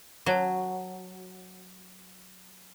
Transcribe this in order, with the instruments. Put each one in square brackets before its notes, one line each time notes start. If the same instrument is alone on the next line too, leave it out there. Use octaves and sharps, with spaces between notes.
[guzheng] F#3 [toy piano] A#4 C#5 A5